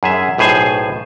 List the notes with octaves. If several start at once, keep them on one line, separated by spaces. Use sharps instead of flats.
F#2 G#4 E5
B1 A2 G#4 C5 G#5